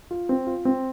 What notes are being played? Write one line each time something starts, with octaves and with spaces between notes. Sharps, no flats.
F4
C4
F4
C4